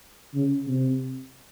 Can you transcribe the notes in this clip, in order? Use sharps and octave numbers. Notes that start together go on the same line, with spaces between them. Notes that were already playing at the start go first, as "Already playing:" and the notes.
C#3
C3